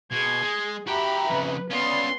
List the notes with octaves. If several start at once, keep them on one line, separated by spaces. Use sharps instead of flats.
B2 G#4 C6 G#6
G#3
F#4 G4 E5 G5 A#5 B5
F2 C#3 B4
B3 C#4 F4 D5 B5 C6 D#6